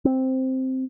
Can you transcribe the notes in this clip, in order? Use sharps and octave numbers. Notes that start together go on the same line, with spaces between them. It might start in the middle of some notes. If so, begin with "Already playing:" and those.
C4